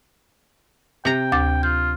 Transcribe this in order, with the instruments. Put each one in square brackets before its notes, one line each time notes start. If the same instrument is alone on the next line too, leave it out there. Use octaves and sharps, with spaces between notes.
[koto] C3 A#5 [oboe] G5
[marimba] D2 D6 A6
[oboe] F4 [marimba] G6